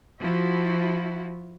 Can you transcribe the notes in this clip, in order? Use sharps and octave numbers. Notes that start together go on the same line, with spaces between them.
F3 E4 F#4